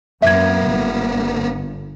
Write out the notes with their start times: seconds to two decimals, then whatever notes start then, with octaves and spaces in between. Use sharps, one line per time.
0.22 F#2 A#3 B3 E5 G#6
0.67 G1